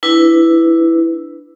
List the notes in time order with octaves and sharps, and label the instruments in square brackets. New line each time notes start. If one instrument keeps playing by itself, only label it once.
[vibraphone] D4 E4 B4